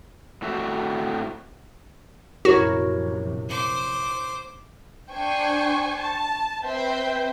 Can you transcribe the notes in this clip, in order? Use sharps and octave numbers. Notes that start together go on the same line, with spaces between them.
A2 A3 C4 F#4 E5
A#1 F#2 C3 E4 F#4 A#4 C#5
C5 D6
D4 C5 G5 G#5 C#6
A5
C4 B4 C5 E5 G5